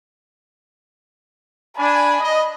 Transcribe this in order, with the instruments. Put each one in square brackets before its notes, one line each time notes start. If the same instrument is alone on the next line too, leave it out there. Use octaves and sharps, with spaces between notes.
[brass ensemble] D4 G#5 [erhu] B5
[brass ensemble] D#5